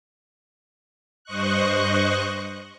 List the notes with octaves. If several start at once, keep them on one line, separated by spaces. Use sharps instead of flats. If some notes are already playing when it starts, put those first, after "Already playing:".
G2 C5 D#5 C#6 F#6